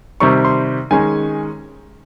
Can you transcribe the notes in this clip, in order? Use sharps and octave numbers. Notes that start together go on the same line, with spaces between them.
C3 D#3 G3 C4 C#6
C6
D#3 G#3 C#4 G#5